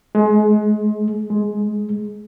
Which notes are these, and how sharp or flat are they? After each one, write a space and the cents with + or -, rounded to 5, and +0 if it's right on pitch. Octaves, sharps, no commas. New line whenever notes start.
G#3 +30
G#3 +15